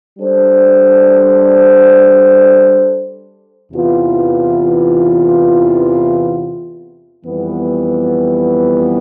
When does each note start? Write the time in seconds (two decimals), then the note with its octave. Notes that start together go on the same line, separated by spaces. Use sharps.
0.19 G3 D4 A4 C5
3.73 E2 C3 E3 B3 F4
7.25 F2 E3 G3 B3